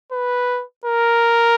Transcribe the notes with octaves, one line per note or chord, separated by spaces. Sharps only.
B4
A#4